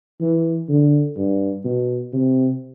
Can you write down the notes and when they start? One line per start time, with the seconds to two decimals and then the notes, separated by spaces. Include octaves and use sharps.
0.21 E3
0.69 D3
1.17 G2
1.65 B2
2.13 C3